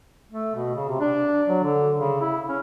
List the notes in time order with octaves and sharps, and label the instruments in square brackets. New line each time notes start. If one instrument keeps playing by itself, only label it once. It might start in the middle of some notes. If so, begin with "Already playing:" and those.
[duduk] A3
B2
C#3
C3
D4
F#3
D3
C#3
E4
C#4